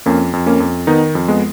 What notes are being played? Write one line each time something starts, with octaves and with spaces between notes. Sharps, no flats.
F2 A#3 C#4
F2
A#3 C#4
F2
D#3 B3 D#4
F2
G#3 B3